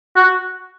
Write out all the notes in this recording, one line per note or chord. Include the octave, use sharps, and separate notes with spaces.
F#4